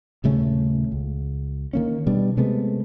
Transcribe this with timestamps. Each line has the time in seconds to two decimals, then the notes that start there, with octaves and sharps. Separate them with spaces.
0.24 D#1 C#3 A3 C#4
0.92 C#2
1.73 D#3 A#3 C#4
2.07 B2 G3 D4
2.37 C3 G#3 A3 B3